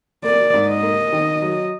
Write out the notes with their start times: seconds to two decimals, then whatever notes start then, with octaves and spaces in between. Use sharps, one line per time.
0.24 A#3 D5
0.54 G#2
0.68 D#5
0.83 A#3
1.13 D#3
1.42 F#3